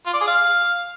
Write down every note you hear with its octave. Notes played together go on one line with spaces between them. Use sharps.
F4
D5
G#4
F5